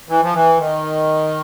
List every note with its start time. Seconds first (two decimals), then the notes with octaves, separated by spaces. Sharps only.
0.09 E3
0.22 F3
0.33 E3
0.58 D#3